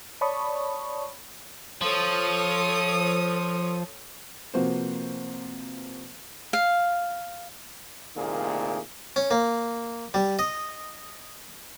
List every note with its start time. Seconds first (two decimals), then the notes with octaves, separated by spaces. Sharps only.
0.21 C#5 D5 A5 B5 C#6 D#6
1.82 F3 A4 C#5 D#6
4.54 C3 F3 A#3 F#4 B4 C5
6.53 F5
8.16 C2 A#2 D#3 A3 A#3 G#4
9.16 C#4
9.31 A#3
10.14 G3
10.39 D#5